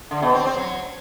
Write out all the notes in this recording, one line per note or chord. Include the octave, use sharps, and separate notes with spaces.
D3
B2
C4
C4
F#3